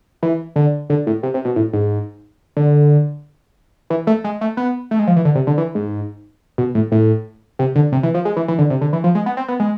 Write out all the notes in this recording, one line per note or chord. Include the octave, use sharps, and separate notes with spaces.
E3
D3
D3
A2
C3
C3
B2
A2
G#2
D3
E3
A3
G#3
A3
B3
A3
G#3
F3
E3
D3
C3
D3
E3
G#2
B2
A2
A2
C3
D3
C3
E3
F3
G#3
E3
E3
D3
C3
D3
E3
F3
G#3
B3
C4
B3
G#3